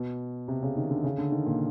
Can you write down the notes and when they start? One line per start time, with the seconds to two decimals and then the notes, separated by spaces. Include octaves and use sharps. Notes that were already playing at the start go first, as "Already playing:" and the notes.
Already playing: B2
0.48 C3
0.63 C#3
0.77 D#3
0.91 D3
1.04 C#3
1.18 D3
1.32 D#3
1.46 A#2